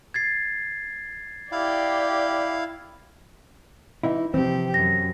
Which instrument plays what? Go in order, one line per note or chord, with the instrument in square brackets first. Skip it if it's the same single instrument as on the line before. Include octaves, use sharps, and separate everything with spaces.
[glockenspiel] G#6 A6 C7
[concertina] E4 F5 [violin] G4 D5
[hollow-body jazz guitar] E3 D#4 E4
[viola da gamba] C3 G4 [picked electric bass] E3 F3 [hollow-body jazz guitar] C4
[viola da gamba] F#2 [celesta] A#6